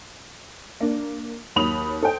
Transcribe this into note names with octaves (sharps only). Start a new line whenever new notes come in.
A#3 D4
D#2 F#3 B5 D#6 F7
A4 C5 G5